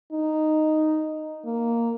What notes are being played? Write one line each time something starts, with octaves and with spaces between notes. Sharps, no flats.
D#4
A#3